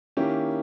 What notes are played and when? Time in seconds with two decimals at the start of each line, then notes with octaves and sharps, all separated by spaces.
0.17 D#3 A#3 C#4 E4 G4